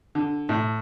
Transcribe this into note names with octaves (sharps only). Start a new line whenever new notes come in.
D3
A2